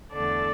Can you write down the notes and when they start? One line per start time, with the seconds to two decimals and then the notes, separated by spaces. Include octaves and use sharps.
0.13 E2 D3 A3 A4 D5